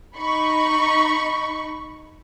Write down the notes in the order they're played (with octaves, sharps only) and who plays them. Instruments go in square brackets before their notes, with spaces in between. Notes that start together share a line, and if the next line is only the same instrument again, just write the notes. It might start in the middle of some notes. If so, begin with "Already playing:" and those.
[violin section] D#4 B5 C#6